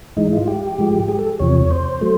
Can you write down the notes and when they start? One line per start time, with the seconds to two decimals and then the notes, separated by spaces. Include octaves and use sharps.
0.17 G#2 E3 G#3 D#4
0.33 E4
0.37 F4
0.48 G4
0.78 G#2 F3 G#3
1.08 G#4
1.19 A4
1.39 E2 C3 F3 C#5
1.71 C5
2.01 F#3 A3